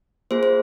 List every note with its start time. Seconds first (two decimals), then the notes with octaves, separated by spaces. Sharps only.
0.31 A#3 F4 G#4 C5
0.43 C5